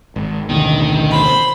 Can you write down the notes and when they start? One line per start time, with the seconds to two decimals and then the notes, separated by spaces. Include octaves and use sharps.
0.16 G#1
0.49 A1 D2 B2 D#3
1.11 C5 B5